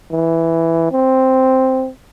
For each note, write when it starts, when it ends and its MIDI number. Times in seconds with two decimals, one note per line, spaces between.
0.11 0.92 52
0.92 1.89 60